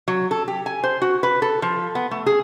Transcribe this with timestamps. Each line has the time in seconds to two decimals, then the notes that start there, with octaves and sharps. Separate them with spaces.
0.08 F#3
0.31 A4
0.48 G4
0.66 G#5
0.84 C5
1.02 F#4
1.23 B4
1.42 A4
1.62 F3
1.95 B3
2.11 A3
2.26 G#4